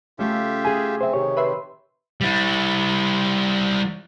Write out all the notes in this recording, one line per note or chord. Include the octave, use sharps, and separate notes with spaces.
C#3 A3 F4 G4 E5
G#4 G#5
C4 C5 E5
C3 D#3 G4 C#5 C#6
B4 E5 C6
G3 E4